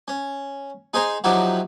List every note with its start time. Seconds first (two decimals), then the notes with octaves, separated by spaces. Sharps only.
0.08 C#4
0.94 D#4 G#4 C5 G#5 A#5 C6
1.24 F3 F#3 D#4 E4 F#4 G4